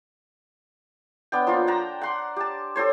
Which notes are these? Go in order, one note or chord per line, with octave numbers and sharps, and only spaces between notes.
B3 D4 G5
F3 A#3 F4
F#5 G5 A5 A#5
F#5 C6 D6
G4 A5
G4 A4 C5 C#5